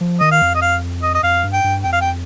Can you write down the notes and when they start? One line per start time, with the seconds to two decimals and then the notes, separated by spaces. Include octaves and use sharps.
0.01 F3
0.20 D#3 D#5
0.32 F5
0.42 F2
0.55 D#5
0.62 F5
1.03 D#5
1.15 D#5
1.23 F2 F5
1.44 G2
1.53 G5
1.64 G2
1.84 F2 G5
1.93 F5
2.02 G5